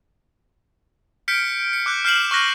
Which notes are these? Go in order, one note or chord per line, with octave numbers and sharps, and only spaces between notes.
F6 G6 B6 C#7 D7
C#7
D6 F#6 G6
F6 G6 C7 E7 F#7
C#6 F6 F#6 A#6